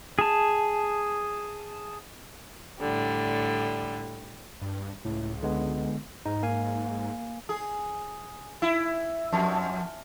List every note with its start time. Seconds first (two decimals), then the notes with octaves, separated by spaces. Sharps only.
0.19 G#4 A5
2.80 A2 D3 G3
4.61 G2
5.05 C#2 A2
5.43 D3 G#3 B3
6.26 G#2 D#4
6.43 A#3 F5 G#5
7.49 G#4
8.62 E4
9.33 F2